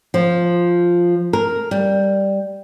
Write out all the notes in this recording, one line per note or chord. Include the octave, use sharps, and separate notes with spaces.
F3
A#4
G3